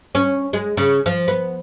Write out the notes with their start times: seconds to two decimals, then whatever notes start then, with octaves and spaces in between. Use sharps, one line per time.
0.15 C#4
0.53 G#3
0.77 C#3
1.06 F3
1.28 B3